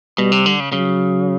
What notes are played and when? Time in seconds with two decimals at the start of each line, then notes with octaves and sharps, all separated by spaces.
0.18 B2 G3
0.32 C3
0.46 D3
0.60 C#3
0.73 C#3 F#3